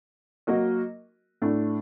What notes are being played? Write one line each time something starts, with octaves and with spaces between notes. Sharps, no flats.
F#3 A#3 F#4 A#4 D#5
A2 A3 D4